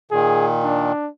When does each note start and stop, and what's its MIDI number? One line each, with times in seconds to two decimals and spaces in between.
0.11 0.92 46
0.11 0.92 51
0.11 0.47 68
0.63 1.09 62